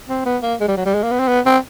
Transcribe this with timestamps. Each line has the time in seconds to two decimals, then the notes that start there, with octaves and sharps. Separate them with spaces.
0.09 C4
0.26 B3
0.42 A#3
0.61 G#3
0.68 G3
0.77 F#3
0.86 G3
0.94 G#3
1.03 A#3
1.11 B3
1.20 C4
1.28 B3
1.46 C4